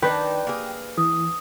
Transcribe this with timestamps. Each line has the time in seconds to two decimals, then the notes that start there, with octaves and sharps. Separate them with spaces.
0.02 D#3 D4 D#4 B4 G5
0.47 A#3 G#4
0.97 E3 D#6